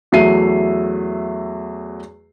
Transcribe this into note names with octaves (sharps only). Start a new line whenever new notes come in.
E2 F#3 A3 E5 C7 D#7